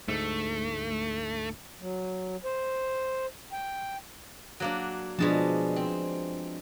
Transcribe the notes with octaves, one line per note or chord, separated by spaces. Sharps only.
D2 G#2 A3
F#3
C5
G5
F#3 A#3 D4
B2 F3 G#3 D4 A5
C4